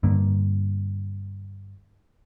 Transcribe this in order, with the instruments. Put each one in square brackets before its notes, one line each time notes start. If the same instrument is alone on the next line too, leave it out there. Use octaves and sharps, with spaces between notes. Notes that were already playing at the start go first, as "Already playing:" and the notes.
[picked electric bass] G2 D3 A#3